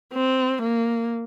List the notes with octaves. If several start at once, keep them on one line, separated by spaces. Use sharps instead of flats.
C4
A#3